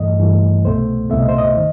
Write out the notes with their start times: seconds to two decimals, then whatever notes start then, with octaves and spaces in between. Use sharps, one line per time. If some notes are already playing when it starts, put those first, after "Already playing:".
Already playing: G2 E3 A3 D#5
0.20 G2 E3 A3
0.65 C2 B2 A3 C5
1.10 C2 B2 A3 E5
1.20 D#5
1.29 C5
1.38 D#5
1.57 D#3